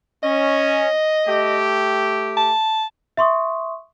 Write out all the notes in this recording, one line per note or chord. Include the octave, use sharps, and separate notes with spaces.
C#4 D#5
A3 G4
A5
E5 C6 C#6 D#6